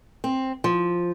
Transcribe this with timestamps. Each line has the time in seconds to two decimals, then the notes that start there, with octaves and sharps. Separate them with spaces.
0.24 C4
0.64 F3